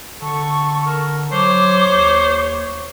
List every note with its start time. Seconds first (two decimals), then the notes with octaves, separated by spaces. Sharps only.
0.22 D3 A4 C#6
0.86 A#4 A5
1.32 F#3 C5 C#5 D6
1.86 D#2